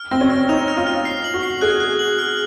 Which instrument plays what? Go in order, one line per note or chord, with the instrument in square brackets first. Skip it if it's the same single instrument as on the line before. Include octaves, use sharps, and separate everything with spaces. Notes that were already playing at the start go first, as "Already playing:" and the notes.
Already playing: [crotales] F6
[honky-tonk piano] C4 [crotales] A#6
[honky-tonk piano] C#4
[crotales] F6
[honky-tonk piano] D#4 [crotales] F7
[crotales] F6
[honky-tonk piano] F4
[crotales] F6
C7
F#7
[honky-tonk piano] F#4
[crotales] C7
[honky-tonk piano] G#4 [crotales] F#6
[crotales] F#6
F#7
F6